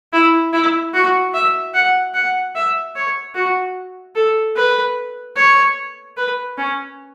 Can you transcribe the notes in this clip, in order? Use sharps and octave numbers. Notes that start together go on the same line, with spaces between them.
E4
E4
F#4
E5
F#5
F#5
E5
C#5
F#4
A4
B4
C#5
B4
C#4